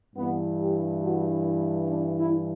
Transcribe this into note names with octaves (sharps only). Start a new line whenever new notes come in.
G2 E3 B3
G4
F#4
D4
E4